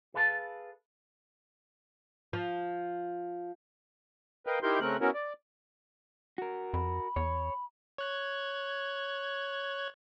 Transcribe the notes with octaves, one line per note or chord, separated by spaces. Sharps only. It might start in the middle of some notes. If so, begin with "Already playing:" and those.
G#4 A4 B4 F5 G#5 A5
F3
A#4 B4 D#5 F5 G5
D#4 E4 G4 A#4 C6 G6
C#3 A3 C4 A#4 F#6
B3 C#4 E4 F#4 A#4
D5
F#4 A#4
F2 B5
E2 C#5
C#5 F#6 G#6